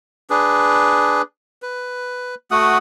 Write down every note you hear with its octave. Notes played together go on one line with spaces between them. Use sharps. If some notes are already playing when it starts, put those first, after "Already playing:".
D4 G#4 B4
B4
A3 F#4 F#5 D#6